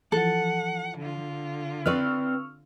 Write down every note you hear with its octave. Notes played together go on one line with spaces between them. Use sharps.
E3 F3 A4 F#5
D3 F4
C4 B4 D5 C#6 E6 F6